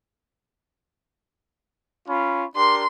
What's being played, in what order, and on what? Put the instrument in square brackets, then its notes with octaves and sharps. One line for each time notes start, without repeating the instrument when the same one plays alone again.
[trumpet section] C#4 F4 B5
[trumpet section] D4 G4 A#4 [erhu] C6